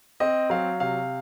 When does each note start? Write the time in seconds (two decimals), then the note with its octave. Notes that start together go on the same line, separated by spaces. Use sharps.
0.20 C4 D#5
0.50 F#3 F5
0.80 C3 F5